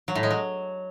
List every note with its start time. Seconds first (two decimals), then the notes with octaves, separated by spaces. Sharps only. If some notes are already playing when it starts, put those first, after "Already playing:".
0.08 F#3
0.15 A2
0.23 G#3
0.31 F#3